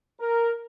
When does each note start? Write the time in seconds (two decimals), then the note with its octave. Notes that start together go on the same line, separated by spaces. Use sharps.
0.21 A#4